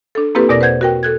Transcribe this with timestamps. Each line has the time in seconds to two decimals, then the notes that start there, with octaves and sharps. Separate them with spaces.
0.15 D4 A4
0.35 A#3 C4 E4 G4 A4 B4
0.49 E2 B2 A#4 D5 D6 A#6
0.61 B4 C5 F#5 G6 G#6
0.81 F#4 A#4 G5
1.03 A4 F#6 G#6